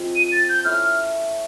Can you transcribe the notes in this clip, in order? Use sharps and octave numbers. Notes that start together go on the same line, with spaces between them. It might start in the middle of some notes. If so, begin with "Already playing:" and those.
Already playing: F3 G#3 C4 F4
D#7
A6
G6
A3 C#4 E4 F6